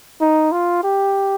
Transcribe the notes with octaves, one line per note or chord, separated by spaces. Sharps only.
D#4
F4
G4